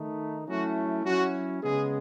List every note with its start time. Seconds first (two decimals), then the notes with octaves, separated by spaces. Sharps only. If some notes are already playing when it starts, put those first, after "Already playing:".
Already playing: D#3 A3 D#4
0.48 F#3 A3 C#4 E4 F#4
1.05 F#3 C#4 E4 F#4
1.63 C#3 G#3 B3 G#4